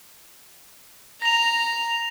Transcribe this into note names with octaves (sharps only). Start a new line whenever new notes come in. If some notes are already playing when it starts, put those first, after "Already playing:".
A#5 A#6 F7